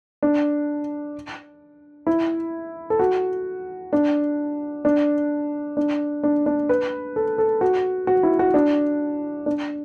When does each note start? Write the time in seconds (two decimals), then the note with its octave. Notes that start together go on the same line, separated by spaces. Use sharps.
0.23 D4
2.07 E4
2.90 A4
2.99 F#4
3.93 D4
4.85 D4
5.77 D4
6.23 D4
6.46 D4
6.69 B4
7.16 A4
7.38 A4
7.61 F#4
8.07 F#4
8.23 E4
8.39 F#4
8.54 D4
9.46 D4